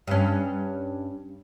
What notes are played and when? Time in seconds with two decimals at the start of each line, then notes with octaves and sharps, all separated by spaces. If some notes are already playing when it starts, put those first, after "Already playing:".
0.07 G2 C#4